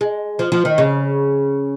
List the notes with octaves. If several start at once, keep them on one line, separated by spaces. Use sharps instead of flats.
G#3
F3
F3
D#3
C#3